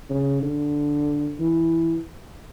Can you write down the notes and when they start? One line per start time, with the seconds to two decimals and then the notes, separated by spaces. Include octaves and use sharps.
0.10 C#3
0.42 D3
1.39 E3